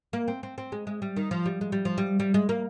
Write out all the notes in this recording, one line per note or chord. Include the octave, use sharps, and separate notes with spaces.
A#3
C4
C4
C4
G#3
G#3
G3
D#3
F3
G3
G#3
G3
F3
G3
G3
G#3
A#3